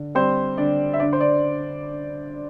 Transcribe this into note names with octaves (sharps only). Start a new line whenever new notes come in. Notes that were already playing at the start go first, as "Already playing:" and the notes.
Already playing: D3
G3 C4 C5
D3 D4 D5
E5
D3 D4 D5
C5
D5